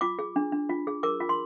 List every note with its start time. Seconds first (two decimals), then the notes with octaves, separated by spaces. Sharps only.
0.01 F4 D6
0.19 G#4
0.36 D4
0.52 D4
0.69 F4
0.87 G#4
1.03 A#4 D6
1.20 F4
1.29 C6